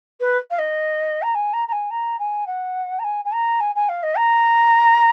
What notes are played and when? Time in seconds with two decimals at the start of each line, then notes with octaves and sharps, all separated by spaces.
0.20 B4
0.50 F5
0.58 D#5
1.22 A#5
1.34 G#5
1.53 A#5
1.67 A#5
1.72 G#5
1.90 A#5
2.19 G#5
2.46 F#5
2.99 A#5
3.04 G#5
3.24 G#5
3.32 A#5
3.60 G#5
3.75 G#5
3.89 F5
4.03 D#5
4.17 A#5